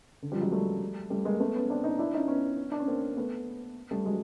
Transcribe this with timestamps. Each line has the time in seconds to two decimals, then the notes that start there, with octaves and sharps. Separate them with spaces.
0.22 D3
0.32 F3 G3
0.41 F#3 G#3
0.52 G3 A3
1.10 G3 A3
1.25 G#3 A#3
1.40 A3 B3
1.55 B3 C#4
1.70 C4 D4
1.84 C#4 D#4
1.99 D4 E4
2.14 C#4 D#4
2.28 B3 C#4
2.72 D4
2.80 C#4
2.88 A#3 C4
3.17 A3 B3
3.91 G3 A3
4.05 F#3 G#3